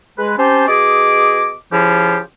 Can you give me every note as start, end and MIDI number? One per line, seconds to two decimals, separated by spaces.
0.18 0.33 56
0.18 0.33 71
0.38 0.67 60
0.38 0.67 61
0.38 0.67 67
0.38 0.67 72
0.38 0.67 81
0.68 1.54 47
0.68 1.54 68
0.68 1.54 75
0.68 1.54 86
1.72 2.19 49
1.72 2.19 53
1.72 2.19 64
1.72 2.19 65
1.72 2.19 67